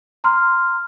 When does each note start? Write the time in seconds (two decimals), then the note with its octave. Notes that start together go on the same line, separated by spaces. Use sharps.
0.24 A#5 C6 F6